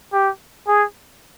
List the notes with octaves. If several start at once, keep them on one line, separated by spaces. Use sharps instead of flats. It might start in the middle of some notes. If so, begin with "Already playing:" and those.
G4
G#4